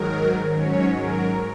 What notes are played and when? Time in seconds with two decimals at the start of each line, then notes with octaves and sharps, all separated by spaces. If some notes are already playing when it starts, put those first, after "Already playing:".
Already playing: G#2 D#3 F#3 A#4
0.52 G#2 F#3 C#4 C#5
0.96 A#4